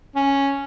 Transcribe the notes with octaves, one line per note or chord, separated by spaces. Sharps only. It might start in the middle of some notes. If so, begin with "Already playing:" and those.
C#4